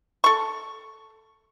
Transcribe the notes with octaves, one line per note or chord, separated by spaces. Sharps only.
A4 C#6